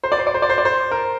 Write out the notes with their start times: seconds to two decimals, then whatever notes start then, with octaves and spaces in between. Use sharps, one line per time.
0.04 C5
0.12 D5
0.19 C5
0.27 D5
0.34 C5
0.42 D5
0.50 C5
0.58 D5
0.65 C5
0.91 A#4